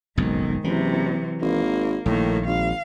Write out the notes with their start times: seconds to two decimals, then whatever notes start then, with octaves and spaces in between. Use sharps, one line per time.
0.18 F#1 B1 F2 G#2 D#3
0.64 F#1 C3 E3 F#3
1.42 G#1 A#3
2.06 A#1 A2 D#3 A#3
2.47 G#1 F5